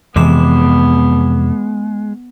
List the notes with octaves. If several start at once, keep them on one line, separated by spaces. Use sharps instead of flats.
F2 C3 E3 G#3 B3 D6 E7